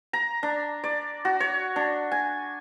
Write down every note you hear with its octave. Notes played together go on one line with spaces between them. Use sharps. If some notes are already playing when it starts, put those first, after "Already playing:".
A#5
D4
D5
F#4
C#5
D4
G#5